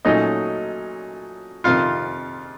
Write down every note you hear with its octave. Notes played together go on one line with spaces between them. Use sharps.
A#2 F#3 A3 C#4 D#4 D#5
F2 C3 D#3 F4 F5